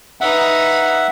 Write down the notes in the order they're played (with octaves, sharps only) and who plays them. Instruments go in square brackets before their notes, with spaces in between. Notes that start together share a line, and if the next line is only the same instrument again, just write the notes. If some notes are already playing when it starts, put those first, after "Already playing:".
[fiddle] D#4 B4 [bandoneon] E5 F#5